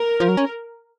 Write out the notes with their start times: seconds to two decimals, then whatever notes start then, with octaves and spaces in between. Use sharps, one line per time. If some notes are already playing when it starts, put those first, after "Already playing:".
Already playing: A#4
0.20 F3
0.28 F#3
0.37 C#4